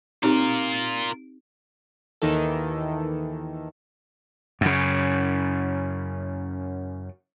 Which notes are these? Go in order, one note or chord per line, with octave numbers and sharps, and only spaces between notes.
C4 D#4 F4 G4 A#4
D#2 D#3 E3 A4
F#2 C#3